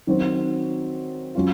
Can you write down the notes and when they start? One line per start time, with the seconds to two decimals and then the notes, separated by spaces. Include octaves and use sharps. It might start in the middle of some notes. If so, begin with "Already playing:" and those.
0.07 D#3 F#3 C4 F#4
1.35 F#3 C#4 F4